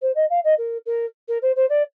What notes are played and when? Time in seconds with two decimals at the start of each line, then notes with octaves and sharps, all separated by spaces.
0.02 C5
0.15 D#5
0.30 F5
0.44 D#5
0.58 A#4
0.86 A#4
1.28 A#4
1.42 C5
1.56 C5
1.69 D5